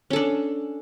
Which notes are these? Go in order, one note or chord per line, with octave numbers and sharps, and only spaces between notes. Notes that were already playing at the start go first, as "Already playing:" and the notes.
C#4 D4 A4